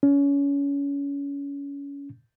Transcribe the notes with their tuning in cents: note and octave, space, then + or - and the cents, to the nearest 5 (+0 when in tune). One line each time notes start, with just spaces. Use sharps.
C#4 +25